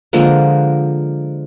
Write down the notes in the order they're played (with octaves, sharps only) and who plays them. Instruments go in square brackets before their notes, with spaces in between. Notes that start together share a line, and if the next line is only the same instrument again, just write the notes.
[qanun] D3 F3 G#3 A#3